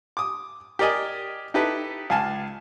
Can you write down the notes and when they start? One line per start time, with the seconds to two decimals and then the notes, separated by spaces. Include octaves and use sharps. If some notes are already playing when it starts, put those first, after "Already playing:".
0.17 D6 D#6
0.79 G4 A#4 D5 D#5 G#5
1.54 D#4 E4 G4 A4 B4
2.10 C#2 F5 G#5 A5